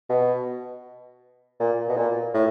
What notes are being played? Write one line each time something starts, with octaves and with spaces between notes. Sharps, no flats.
B2
A#2
B2
A#2
A2